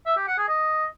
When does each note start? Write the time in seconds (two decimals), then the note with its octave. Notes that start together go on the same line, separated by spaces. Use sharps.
0.06 E5
0.17 G4
0.27 F#5
0.38 G#4
0.49 D#5